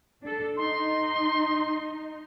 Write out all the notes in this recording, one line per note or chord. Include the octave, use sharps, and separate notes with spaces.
D4 A4
D#4 C6